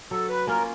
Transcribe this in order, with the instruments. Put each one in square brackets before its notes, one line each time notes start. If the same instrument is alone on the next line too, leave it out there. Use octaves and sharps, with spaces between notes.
[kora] F#3 [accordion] A4
[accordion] B4
[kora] A#3 C#4 F4 [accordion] A#4